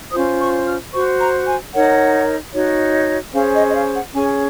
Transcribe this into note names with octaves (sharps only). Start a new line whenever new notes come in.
C#4 F4 C5 D#6
C#6
F6
F#4 C5 C#6
A#5
G#5
D#4 A#4 C#5 F#5
D#4 F#4 C#5
C#4 G#4 C5 F5
D#5
D#5
F5
F#5
C#4 G#4 C#5 G#5